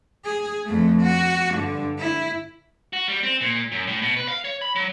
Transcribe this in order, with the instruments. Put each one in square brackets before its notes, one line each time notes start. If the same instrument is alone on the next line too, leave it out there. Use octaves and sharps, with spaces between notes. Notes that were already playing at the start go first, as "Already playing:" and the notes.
[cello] G#4
F2 A3
F#4
G2 D3
E4
[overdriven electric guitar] F#4
G3
C4
A#2
F#2
A2
B2
B4
F5
C#5
B5
F#3